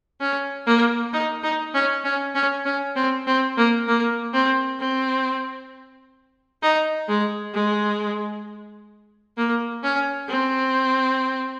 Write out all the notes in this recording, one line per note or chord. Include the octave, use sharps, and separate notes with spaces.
C#4
A#3
D#4
D#4
C#4
C#4
C#4
C#4
C4
C4
A#3
A#3
C4
C4
D#4
G#3
G#3
A#3
C#4
C4